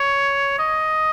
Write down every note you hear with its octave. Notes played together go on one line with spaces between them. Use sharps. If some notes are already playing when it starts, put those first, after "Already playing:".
Already playing: C#5
D#5